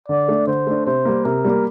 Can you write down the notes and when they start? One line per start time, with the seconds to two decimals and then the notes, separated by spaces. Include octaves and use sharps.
0.08 D3 D5
0.28 A3 D4
0.47 D3 C5
0.67 A3 D4
0.86 C3 C5
1.05 G3 A#3
1.25 C3 A#4
1.44 G3 A#3